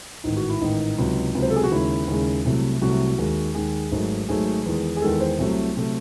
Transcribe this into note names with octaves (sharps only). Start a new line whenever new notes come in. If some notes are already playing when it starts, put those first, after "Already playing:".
A1 G#2 D#3 D#4
F#4
E4
A1 G#2 D#3 D#4
C#2 C3 F#3
C#2 C3 F#3
C5
A4
G#4
F#4
D#2 C#3 G#3 E4
D#2 C#3 G#3
C2 C3 F#3 A3
C2 C3 F#3 A3 F#4
D#2 D#3 G#3
D#2 D#3 G#3 G#4
G#1 G#2 F#3 A3
G#1 G#2 F#3 A3 G#4
E2 D#3 G#3
G#4
E2 D#3 G#3 A4
C5
C2 C3 F#3 A3
C3 F#3 A3